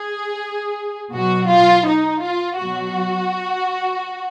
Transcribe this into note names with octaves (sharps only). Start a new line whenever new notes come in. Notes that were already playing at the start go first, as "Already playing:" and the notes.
Already playing: G#4
B2 F#3 F#4
F4
D#4
F4
B2 F#3 F#4